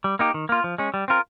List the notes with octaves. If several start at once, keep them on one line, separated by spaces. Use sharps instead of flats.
G3
A#3 D#4 G4
D#3
A#3 F4
F3
G#3 C#4
G3
C4 F4 A#4